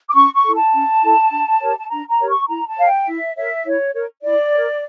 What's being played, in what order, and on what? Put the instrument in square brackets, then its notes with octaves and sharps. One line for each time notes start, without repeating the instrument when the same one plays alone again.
[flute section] D6
C#4 C#6
C#6
E4 A4
A5
C#4
E4 A4
D4
G4 A#4 C#5
A5
D4 A#5
A#5
G4 A#4 C#5
C#6
E4 A#5
A5
A#4 C#5 F5
G5
E4 E5
A#4 C#5 E5
E4 C#5
A#4 C#5
E4 D5
A#4 C#5